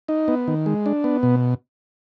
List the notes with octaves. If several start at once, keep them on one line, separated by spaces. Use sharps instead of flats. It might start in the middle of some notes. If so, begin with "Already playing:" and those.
D#4
B3
D#3
G#3
D4
B3
B2